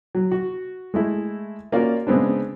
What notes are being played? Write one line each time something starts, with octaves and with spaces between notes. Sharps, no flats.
F#3
F#4
G#3 A3 E4
A#3 C#4 F4 F#4 D5 F5
C#3 G#3 B3 C4 D4